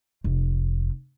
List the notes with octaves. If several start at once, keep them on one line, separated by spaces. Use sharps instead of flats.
F1